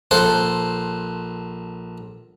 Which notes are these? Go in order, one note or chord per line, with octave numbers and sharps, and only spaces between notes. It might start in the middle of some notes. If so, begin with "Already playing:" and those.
A#1 A4 C5 F#5 C6